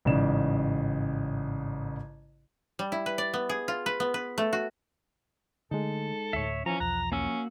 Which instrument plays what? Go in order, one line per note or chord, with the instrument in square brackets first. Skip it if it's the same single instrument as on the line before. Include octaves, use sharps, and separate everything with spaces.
[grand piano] A1 G#2 C#3 D5 E7
[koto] G3
E4
B4
D5
B3
G#4
F4
B4
B3
B4
A3
F#4
[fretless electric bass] D3 A3 [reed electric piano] G#3 D#4 [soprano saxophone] A4
[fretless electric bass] D2 A2 [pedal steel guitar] C#5 E5
[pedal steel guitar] E3 A#5 [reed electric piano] F3 [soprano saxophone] C#4
[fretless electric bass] B1 E2 [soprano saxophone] A#5 [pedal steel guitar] F#6
[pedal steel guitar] A#3 F#4 E6 [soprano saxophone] C#4